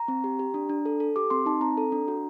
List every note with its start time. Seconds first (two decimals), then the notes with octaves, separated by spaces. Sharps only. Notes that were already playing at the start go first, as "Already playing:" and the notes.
Already playing: A#5
0.08 C4
0.24 G4
0.39 G4
0.54 D4
0.69 D4
0.85 A4
1.00 A4
1.16 G4 D6
1.30 C4 C6
1.46 D#4 A5
1.61 C4 A#5
1.77 A4
1.92 D4
2.08 F#4